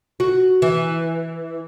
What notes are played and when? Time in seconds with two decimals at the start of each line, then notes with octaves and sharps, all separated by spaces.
0.20 F#4
0.62 E3